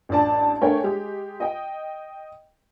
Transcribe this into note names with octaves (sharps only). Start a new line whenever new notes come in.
A1 D4 D5 A5
A3 D4 A#4 C#5 G5 G#5
G#3 G4
D#5 G5